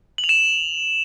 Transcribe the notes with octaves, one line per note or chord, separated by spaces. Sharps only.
F#7
F7
E7